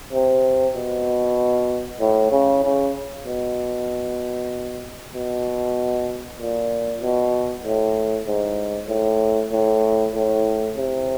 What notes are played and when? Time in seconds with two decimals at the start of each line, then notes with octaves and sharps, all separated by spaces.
0.13 C3
0.75 B2
2.00 A2
2.32 C#3
2.64 C#3
3.26 B2
5.14 B2
6.39 A#2
7.01 B2
7.64 A2
8.27 G#2
8.89 A2
9.52 A2
10.15 A2
10.77 C3